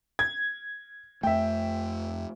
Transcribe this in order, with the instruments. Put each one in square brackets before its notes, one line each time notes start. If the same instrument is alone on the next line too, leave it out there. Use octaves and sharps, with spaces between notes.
[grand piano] G#6
[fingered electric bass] F2 A3 [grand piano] E5 G5